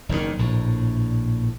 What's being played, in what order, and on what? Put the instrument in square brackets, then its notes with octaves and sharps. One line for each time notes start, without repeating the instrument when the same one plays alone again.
[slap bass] F#1 E2 G#2 D#3
A#1 A2